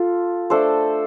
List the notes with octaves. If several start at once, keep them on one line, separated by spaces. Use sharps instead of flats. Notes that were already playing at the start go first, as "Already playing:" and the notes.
Already playing: F4 A4
A3 D4 A4 C5